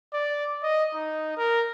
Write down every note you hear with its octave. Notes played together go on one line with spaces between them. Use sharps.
D5
D#5
D#4
A#4